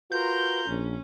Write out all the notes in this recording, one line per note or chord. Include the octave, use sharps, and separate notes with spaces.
F4 F#4 A#4 B4 A#5 C6 G6
A#1 C#4